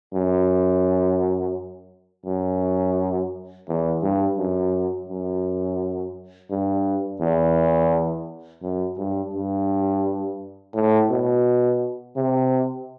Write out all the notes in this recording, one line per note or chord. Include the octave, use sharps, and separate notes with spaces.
F#2
F#2
E2
G2
F#2
F#2
G2
E2
F#2
G2
G2
A2
B2
C3